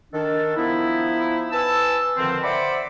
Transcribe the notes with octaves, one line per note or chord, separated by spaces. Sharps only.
D#3 D4 A4
F3 B3 D#4 E4
B4 G#5 A5 E6
F2 D3 D#3 F3 C4
C5 D5 E5 F#5 B5 D6